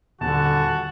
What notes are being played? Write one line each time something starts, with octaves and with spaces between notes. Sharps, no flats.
D#1 D3 F#4 A5